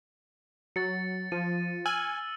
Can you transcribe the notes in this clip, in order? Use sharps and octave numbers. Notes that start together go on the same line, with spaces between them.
F#3 A6 C#7
F3 D#7
G#5 E6 F6 F#7